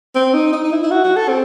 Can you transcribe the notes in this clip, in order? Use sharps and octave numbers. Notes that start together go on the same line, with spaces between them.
C4
D#4
D#4
D#4
E4
E4
F#4
F#4
A4
C4